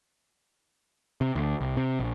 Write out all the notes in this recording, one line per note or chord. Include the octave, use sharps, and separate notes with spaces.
C3
D2
C2
C3
A#1